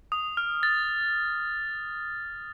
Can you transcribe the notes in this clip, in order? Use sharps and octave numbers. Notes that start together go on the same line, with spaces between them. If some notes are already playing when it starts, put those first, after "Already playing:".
D#6
F6
A6